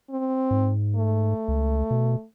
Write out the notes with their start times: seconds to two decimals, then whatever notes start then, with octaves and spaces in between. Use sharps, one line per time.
0.10 C4
0.51 G#2
0.96 A3
1.48 C#2
1.90 B2